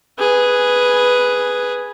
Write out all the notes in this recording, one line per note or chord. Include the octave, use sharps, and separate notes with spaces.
G#4 B4